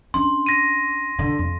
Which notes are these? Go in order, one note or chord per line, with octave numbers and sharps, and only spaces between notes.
C#4 D4 C6
A#6 D#7
D3
F2